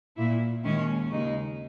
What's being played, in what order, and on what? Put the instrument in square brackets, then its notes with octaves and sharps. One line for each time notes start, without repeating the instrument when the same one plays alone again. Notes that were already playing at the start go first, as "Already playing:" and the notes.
[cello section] A#2 A#3 E4
D#2 D#3 G#3 C#4
D#2 C#3 G#3 D#4